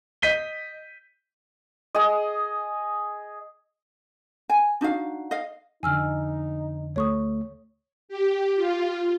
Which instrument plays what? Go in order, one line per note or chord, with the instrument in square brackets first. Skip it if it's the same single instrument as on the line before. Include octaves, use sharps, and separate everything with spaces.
[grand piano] D#5 G6 B6 D#7 G7
[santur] G#4 D#5
[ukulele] G#5
D4 D#4 F#4 F5
D#5 F5
[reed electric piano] F2 D3 [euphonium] D#4 [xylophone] G#5 E6 F6
[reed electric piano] D2 A3 [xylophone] C#5 C#6 D#6
[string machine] G4
F4